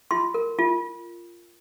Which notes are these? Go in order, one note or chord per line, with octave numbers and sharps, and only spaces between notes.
F4 C6
A#4
F4